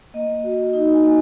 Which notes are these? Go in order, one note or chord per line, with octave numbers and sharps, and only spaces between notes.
A#3 D#5
F#4
D#4 D#5
G#5
A#3